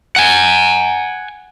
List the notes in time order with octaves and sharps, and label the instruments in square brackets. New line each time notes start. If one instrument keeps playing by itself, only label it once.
[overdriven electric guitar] F#5 G#5